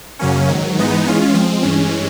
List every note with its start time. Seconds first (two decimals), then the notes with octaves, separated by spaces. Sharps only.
0.19 F#2 C#3 F#3 A#3 C#4
0.48 G#2 D#3 F#3
0.77 G#2 E3 G#3 B3 D#4
1.05 E3 G#3 C#4 F4
1.34 F3 G#3 C4
1.62 G2 E3 G#3 C#4